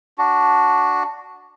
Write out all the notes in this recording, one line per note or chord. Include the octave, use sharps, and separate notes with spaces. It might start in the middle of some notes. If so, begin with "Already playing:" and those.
D4 F#4